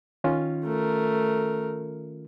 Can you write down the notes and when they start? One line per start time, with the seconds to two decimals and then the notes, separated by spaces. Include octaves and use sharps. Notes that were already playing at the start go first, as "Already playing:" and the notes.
0.24 D#3 C#4 F4
0.65 A3 A#4